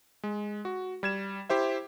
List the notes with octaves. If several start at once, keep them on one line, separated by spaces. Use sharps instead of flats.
G#3
F#4
G3 G#6 E7
E4 G4 C5 E5